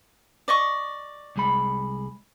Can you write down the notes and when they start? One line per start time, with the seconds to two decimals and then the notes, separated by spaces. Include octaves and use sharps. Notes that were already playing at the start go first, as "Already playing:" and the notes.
0.48 D5 D#5 C#6
1.36 C2 G#3 B5